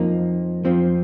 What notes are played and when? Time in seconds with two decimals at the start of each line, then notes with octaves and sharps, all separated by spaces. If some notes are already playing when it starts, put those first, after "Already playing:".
Already playing: F2 F3 A#3 D#4
0.65 F2 F3 C4